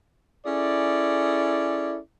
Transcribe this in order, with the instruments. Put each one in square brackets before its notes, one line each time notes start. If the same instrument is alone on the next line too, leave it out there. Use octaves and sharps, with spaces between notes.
[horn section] C#4 E4 G#4 A4 D5